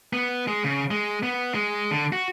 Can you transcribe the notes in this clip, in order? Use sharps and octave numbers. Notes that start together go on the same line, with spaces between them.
B3
G#3
C#3
G#3
B3
G#3
D3
F#4